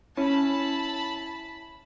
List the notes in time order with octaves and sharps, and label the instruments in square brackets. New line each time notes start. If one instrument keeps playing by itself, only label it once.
[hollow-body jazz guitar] C#4 [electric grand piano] E4 [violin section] A5 B5